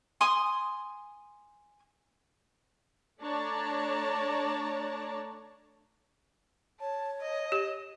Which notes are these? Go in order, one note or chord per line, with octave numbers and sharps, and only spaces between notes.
G#5 C6 D#6
A3 D4 C#5 D5 A5 A#5
C#5 A5
D#5
G4